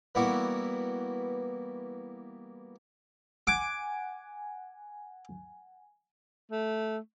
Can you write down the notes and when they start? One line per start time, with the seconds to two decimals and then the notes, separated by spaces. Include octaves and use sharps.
0.15 E3 G3 A#3 B3 E4 F#4
3.47 F#5 G#5 D6
6.51 A3